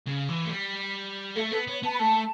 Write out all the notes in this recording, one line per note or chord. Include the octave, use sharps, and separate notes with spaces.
C#3
E3
A3
G3
A3 A4
B3 A4
B3 C#5
B3 A5
B5
A3 A5